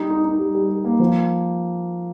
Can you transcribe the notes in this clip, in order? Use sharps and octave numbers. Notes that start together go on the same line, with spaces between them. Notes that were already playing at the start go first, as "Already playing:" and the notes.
Already playing: G3 D#4 G4
D#4
D#4
G3
G3
G3
A#3
F3